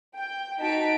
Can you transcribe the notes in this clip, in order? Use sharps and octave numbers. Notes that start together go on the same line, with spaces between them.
G5
D#4 F#4 A5 B6 D7